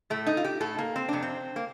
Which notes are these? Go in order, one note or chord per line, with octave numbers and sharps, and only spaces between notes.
A2 A3
D#4
F4
G4
A2 A4
A#3
C4
F2 C3 D4
C4
A#3